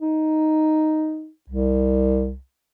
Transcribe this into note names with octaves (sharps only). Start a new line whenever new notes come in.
D#4
C2